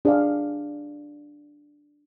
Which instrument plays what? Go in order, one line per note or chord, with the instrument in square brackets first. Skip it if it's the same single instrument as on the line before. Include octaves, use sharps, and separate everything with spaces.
[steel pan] D4 G#4 D5 F5